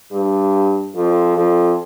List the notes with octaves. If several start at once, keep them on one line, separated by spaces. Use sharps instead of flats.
G2
F2
F2